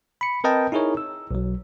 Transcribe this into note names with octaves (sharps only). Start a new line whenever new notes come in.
B5 C#7
C4 A#4 B4 D#5 G5 A5
D#4 E4 G#4 A#4 C#5
E6
B1 F#3